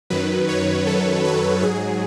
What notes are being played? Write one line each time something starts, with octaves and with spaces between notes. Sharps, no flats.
F#2 D#3 F#3 B4
C#5
A4
B4
G#2 F#3 G#4